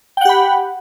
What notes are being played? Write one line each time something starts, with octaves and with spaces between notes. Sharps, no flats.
G4 F#5 G5 B5